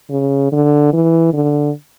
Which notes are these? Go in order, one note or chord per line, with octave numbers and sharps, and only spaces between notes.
C#3
D3
E3
D3